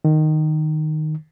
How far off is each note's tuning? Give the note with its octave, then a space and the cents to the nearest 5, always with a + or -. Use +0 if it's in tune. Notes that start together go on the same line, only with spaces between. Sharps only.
D#3 -10